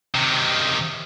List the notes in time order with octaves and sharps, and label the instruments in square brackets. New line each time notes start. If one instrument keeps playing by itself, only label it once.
[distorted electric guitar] C3 D#3